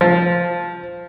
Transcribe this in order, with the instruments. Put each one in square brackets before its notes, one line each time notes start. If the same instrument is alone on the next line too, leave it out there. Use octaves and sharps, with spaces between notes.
[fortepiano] F3